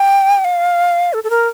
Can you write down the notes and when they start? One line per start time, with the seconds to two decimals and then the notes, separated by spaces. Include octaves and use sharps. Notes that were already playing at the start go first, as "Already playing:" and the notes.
Already playing: G5
0.45 F5
1.13 A4
1.24 A4
1.30 A#4